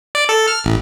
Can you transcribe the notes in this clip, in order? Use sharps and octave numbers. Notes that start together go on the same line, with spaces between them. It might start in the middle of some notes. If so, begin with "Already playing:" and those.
D5
A4
F6
A1